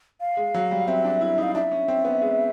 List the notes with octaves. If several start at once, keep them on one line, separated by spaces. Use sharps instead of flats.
F5
G#3
F#3
G3
C4 E5
D4
E4
D#4
F5
D4 E5
C#4
C4
B3
G#3